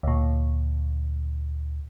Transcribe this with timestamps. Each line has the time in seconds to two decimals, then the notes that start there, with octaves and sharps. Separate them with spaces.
0.03 D2 A#2